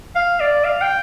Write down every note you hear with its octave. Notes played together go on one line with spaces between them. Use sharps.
F5
D5
F5
G5